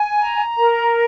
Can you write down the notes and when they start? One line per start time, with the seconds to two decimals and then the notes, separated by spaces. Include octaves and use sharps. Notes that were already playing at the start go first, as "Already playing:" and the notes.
Already playing: G#5
0.20 A#5
0.57 A#4